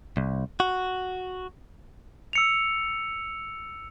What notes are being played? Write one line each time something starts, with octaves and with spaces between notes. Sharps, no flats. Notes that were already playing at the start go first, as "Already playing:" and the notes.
C2
F#4
E6 C#7 F7